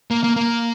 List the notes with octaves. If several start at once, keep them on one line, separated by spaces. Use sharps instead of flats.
A#3
A#3
A#3